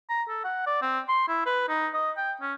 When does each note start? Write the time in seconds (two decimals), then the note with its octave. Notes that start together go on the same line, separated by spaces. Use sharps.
0.10 A#5
0.29 A4
0.44 F#5
0.66 D5
0.82 C4
1.09 C6
1.28 E4
1.46 B4
1.69 D#4
1.94 D#5
2.17 G5
2.41 C#4